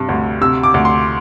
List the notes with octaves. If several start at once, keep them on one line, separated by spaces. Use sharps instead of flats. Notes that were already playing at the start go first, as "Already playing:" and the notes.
Already playing: G2 C3
D2
C3 E6
D6
D2
C6